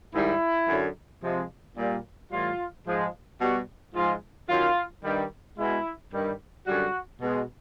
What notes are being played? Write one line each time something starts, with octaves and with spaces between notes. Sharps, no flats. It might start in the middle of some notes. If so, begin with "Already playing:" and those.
G#2 D#3 G3 E4
F#2 D3 F#3
C3 F3 G#3
A#2 G3
A2 E3 G3 F4
G#2 F3 G#3
B2 G3 F#4
G#2 F3 G#3 F4
F#2 D#3 F#3 F4
G2 D#3 G3
B2 G#3 E4
G2 D#3 G3
F#2 D3 G3 F#4
B2 G#3